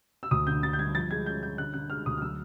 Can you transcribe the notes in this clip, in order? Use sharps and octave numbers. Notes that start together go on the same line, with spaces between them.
E6
D2 D#6
D3 G6
D3 A6
G6
G3 G#6
F3 A6
G#3 G#6
C#4 G6
C#4 G6
D3 F#6
D3 F#6
G#3 F6
D2 D#6
F6
F#3 E6